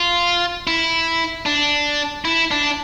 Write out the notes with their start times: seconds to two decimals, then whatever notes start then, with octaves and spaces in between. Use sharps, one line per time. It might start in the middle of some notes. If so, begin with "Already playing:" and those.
Already playing: F4
0.67 E4
1.46 D4
2.25 E4
2.51 D4